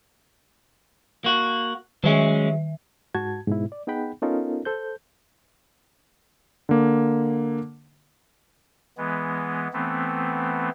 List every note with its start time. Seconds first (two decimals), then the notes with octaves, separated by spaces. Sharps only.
1.24 A#3 F#4
2.04 D#3 F#3 G#3 C#4 E5
3.15 G#2 F#4 A5 G#6
3.47 G#2 B2 E4
3.72 D5
3.87 B3 D#4 G#4 F#5 G5 B5
4.22 B3 C#4 D#4 F4 A4 A#4
4.65 A4 C5 G6
6.69 D3 A#3
8.97 E3 G#3 B3
9.73 E3 A3 B3 C4